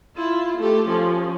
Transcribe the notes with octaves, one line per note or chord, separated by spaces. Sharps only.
E4 F4
A3 G4
F3 C#4